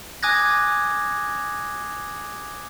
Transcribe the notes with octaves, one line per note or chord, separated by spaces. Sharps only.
G#5 D6 D#6 F#6 G#6 A#6